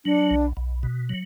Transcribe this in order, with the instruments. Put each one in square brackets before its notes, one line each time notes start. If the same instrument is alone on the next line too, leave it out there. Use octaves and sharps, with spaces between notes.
[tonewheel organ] F#3 [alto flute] D4
[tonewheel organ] B1
B1
B2
F#3